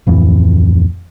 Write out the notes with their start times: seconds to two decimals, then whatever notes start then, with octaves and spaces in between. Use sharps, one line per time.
0.07 D1 F2 A2 E3